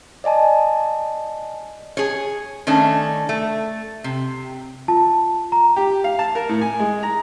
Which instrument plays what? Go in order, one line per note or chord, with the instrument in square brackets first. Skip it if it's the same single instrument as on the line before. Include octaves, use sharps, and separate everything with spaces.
[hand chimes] D5 D#5 G#5 A5
[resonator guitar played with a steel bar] G#4 C#5
D#3 A3 C#4 D4
A3
C3
[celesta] F4 A5
A#5
[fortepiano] G4
F5
A5
A#4
A2
G#5
G#3
A#5